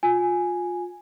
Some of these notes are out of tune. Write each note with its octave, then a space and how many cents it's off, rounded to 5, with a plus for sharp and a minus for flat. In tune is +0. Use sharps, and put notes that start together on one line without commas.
F4 +25 G#5 +0